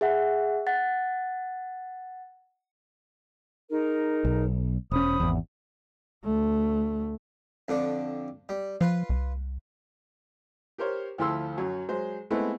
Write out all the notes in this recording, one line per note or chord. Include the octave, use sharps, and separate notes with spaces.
G#4 E5 F#5
F#5 A6
D#4 G#4 A#4
B1
E1 C#4 C5 B5 D#6
G#1 E2
D2 A3
F2 D3 D4
G3
F3 F4 B4
C2
G4 A#4 C5 C#5
D2 F3 E4 A4 C6 E6
F#2 F#3 C#5
F#3 G#3 C5
G#3 A3 B3 C4 D#4 E4